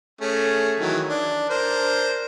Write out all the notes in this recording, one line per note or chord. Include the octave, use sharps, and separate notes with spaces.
A3 C#4 G#4
D#3 E3 F#3
D4
D4 A#4 C5